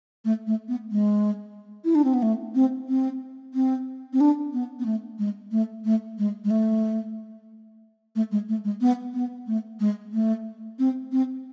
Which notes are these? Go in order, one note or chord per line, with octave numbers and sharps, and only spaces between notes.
A3
A3
B3
G#3
E4
D4
C4
B3
A3
C4
C4
C4
C4
D4
B3
B3
A3
G#3
A3
A3
G#3
G#3
A3
A3
G#3
A3
G#3
B3
B3
A3
G#3
A3
C4
C4